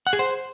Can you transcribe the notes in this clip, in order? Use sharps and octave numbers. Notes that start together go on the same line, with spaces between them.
F#5
G#4
C5